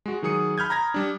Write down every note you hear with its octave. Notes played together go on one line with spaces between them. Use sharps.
G#3 F#4
D#3 F#3 G#4 D#6 C#7
B5 F6 G6 G#6
A#5 B5 G#6 A#6
G3 D4